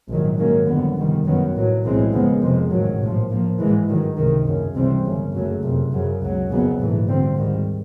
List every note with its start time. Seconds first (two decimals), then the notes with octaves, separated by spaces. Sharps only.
0.09 A#1 G#2 D#3 F#3
0.38 G#2 D#3 F#3 A#3 C#4
0.67 G1 F2 D3 G3 B3
0.96 G1 F2 C3 D#3 G3
1.25 F#2 D#3 F#3 B3
1.55 A#1 A2 F#3
1.84 B1 A2 E3 G#3 C4
2.13 D#2 C#3 F3 G#3 B3
2.42 F2 C3 F3 G#3
2.71 A1 G#2 D#3 F#3
3.00 A#1 A2 F3
3.29 A#1 A2 F3 A#3
3.59 G#2 E3 G#3
3.88 G2 D#3 F#3
4.17 C#2 C3 D#3
4.46 F#1 F#2 C#3
4.75 C#2 C3 E3 G3 C4
5.05 G1 F#2 C#3
5.33 F#1 F#2 C#3 F#3 A3
5.63 F#1 F2 C3
5.92 F#2 C#3 F#3
6.21 C#2 B2 F#3
6.50 F#1 F2 C#3 F#3 B3
6.79 A#1 G#2 E3 A3
7.08 D2 D3 G3 C4
7.37 G#1 G#2 D#3 G3